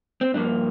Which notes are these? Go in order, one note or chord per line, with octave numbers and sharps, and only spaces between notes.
C4
G2 F3 A#3 D4